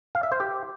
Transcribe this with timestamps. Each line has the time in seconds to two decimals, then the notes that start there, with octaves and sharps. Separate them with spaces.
0.15 F5
0.23 E5
0.32 C5
0.40 G4